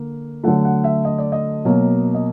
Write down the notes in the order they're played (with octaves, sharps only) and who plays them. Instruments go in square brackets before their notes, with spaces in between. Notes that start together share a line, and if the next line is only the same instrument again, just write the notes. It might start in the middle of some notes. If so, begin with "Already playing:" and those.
Already playing: [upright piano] D3 A#3
D3 F#3 A3 F#5
F#5
E5
D#5
D5
D#5
B2 F#3 A#3
D#5